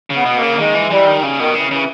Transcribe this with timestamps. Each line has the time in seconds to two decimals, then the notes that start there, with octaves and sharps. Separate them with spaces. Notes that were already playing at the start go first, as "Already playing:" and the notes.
0.10 C#3 B3
0.25 B2
0.37 A#3
0.42 C#3
0.58 D#3 G#3
0.74 E3
0.90 E3 G3
1.07 D#3
1.23 C#3
1.39 B2 D#3
1.55 C#3 E3
1.71 C#3 E3